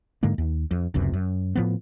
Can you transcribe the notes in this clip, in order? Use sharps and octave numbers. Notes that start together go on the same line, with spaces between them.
G#2 D3 G#3 A#3
D#2
F2
F1 C#2 F#2 C3
F#2
A2 F3 B3